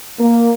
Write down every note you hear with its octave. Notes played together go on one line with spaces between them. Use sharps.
A#3